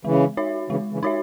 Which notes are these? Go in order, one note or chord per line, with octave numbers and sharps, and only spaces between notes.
C#3 E3 G#3
D#4 F#4 C#5 E5
C#3 E3 G#3
C#3 E3
D#4 F#4 C#5 E5